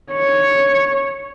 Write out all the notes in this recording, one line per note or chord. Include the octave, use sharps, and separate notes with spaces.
C#5